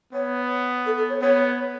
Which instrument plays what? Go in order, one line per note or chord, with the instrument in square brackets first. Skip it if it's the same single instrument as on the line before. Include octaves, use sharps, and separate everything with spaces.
[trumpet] B3 [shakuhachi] C#5
[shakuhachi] A4
A4
C#5
[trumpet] B3 [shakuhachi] C#5